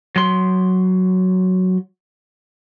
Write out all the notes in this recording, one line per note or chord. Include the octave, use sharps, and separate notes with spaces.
F#3 C6